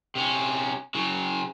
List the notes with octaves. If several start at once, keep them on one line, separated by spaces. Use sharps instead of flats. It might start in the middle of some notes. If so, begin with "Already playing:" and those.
C3 C#4
C#3 F#3